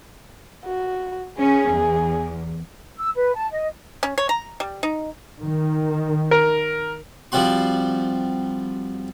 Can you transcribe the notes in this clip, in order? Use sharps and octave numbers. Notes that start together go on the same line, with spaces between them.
F#4
C#4 G#4
E2
E6
B4
A5
D#5
C#4
C#5
A#5
G3
D#4
D#3
A#4
F3 G3 C4 F#4 C6